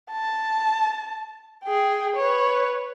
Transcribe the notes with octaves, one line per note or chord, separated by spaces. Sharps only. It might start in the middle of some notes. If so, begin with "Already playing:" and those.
A5
G#4 G5
B4 C#5